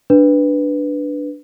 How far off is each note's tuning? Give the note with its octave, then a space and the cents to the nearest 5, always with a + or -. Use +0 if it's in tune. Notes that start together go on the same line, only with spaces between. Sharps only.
D4 +0 B4 +0